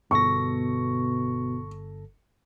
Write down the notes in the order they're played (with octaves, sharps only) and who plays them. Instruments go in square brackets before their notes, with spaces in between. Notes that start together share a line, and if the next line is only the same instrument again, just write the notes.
[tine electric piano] G1 A4 A#6 [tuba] B2 [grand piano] C#6